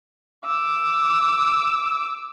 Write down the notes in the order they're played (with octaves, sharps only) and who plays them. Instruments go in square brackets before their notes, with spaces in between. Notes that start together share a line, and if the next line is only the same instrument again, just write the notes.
[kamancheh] D6 E6